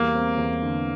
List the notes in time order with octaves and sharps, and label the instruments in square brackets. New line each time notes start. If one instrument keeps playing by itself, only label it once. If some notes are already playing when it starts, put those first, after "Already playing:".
Already playing: [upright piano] E2 G3 [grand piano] A#3
[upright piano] C4
E2
D3